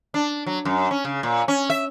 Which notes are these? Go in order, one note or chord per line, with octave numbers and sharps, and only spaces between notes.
D4
F#3
F#2
C#4
C#3
A#2
C#4
E5